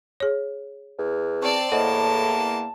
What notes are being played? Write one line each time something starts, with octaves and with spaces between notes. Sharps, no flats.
G#4 C#5
E2
C4 D5 A5 C#6
E2 A2 A#3 C5 D#5 F#5 A5